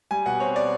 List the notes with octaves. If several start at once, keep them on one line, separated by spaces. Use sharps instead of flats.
G3 G#5
B2 F#5
C4 C#5
D5